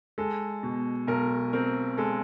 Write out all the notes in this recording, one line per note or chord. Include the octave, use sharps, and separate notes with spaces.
G#3 A4
B2
B1 A#4
C4 A#4
G#3 A4